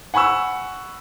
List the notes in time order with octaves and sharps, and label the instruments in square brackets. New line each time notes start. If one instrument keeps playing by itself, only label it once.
[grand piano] F#5 G#5 B5 C#6 E6